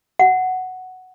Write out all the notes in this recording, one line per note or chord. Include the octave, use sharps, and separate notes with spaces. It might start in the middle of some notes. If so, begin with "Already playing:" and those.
F#5